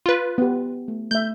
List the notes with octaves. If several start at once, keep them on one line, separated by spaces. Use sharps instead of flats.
F4 B4
B3 G4
A3
A3 E5 G6